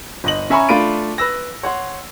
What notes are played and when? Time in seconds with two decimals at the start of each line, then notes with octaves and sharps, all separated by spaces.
0.24 G1 D#5 F#7
0.50 C#4 E5 G#5 A#5 B5 C#6
0.69 A3 D4 F4 B5 D7 D#7
1.18 B4 E6 A#6
1.63 C#5 F#5 C6